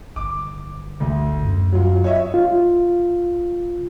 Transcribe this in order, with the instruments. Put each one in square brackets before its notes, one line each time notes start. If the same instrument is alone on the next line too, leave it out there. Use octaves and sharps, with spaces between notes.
[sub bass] G1 [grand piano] D6
[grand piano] D2
[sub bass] F#2
[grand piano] F#3 F4
C#5 D#5 E5
[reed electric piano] F4